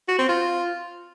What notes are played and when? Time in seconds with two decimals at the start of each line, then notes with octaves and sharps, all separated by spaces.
0.08 F#4
0.18 C4
0.29 F4